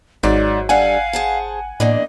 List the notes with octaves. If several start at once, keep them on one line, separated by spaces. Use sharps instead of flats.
G#1 G#2 F#3 D5
G3 D4 A4 F5 F#5 G#5
G#4 C5 A5
E2 A2 A#3 D4 D#5